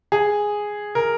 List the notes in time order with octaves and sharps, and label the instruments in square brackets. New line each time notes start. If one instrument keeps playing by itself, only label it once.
[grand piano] G#4
A#4